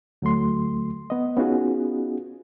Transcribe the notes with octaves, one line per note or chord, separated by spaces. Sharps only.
D2 F#3 A3 C6
B3 D#5
B3 C#4 D#4 F4 F#4 G#4